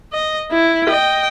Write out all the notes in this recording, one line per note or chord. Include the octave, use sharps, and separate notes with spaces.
D#5
E4
D#5 G5